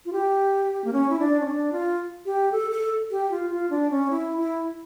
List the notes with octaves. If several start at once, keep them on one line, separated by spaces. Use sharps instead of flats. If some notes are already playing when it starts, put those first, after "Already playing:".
F4
G4
A#3
C#4
E4
D4
C#4
D4
F4
G4
A4
A4
G4
F4
F4
D4
C#4
E4
E4